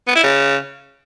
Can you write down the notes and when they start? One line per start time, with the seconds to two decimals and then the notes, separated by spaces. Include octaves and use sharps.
0.08 B3
0.16 E4
0.23 C#3